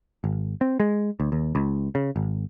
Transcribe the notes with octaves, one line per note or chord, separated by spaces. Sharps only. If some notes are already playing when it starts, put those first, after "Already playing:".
G#1
C4
G#3
D2
D#2
C#2
C#3
G#1